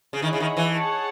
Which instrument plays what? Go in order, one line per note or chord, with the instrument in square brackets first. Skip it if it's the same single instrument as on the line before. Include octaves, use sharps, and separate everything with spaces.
[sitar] C#3
[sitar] D#3 [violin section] E4 G#4 C#5 F#5
[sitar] C#3
D#3
E3
[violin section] G#4 C#5 F#5 A5